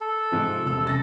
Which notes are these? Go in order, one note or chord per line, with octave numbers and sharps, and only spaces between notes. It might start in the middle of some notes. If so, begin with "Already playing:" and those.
A4
G#2 C3 F3
E1 C3 E6
F#2 A6 A#6